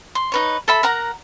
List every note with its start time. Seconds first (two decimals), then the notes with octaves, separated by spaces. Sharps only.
0.15 C6
0.32 D#4 B4 C#5
0.68 A4 E5 B5
0.83 A#4 F#5 A#5